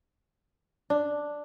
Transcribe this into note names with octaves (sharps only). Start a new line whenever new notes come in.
D4